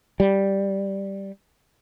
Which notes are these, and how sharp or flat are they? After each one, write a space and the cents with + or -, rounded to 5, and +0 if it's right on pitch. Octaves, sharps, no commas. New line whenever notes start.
G3 +0